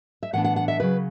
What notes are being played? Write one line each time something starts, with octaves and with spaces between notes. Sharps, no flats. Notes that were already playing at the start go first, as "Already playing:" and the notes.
E5
A2 E3 B3 D4 F#5
F#5
F#5
E5
C#3 F#3 C#4 B4